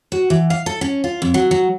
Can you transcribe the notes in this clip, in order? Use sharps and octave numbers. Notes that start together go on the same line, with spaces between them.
F#4
E3
F5
A4
C#4
F4
F2
F#3
F#3